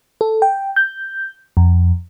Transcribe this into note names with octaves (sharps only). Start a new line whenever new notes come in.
A4
G5
G6
F2